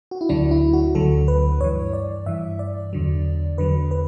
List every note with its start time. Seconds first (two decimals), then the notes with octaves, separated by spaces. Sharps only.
0.11 F#4
0.21 E4
0.29 D2 D3 F#3 D4
0.51 E4
0.73 F#4
0.95 D2 D3 F#3 A4
1.28 B4
1.61 G2 E3 C#5
1.93 D5
2.26 G2 E3 E5
2.59 D5
2.93 E2 D3 F#3
3.57 E2 D3 F#3 B4
3.91 B4